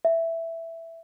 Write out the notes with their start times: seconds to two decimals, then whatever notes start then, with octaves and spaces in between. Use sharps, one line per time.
0.05 E5